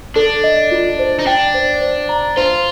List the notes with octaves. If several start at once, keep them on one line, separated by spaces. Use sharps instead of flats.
D4 A4
D#5
F4
C5
D#4
D4 G5
C5
C5
A#5
F4 C5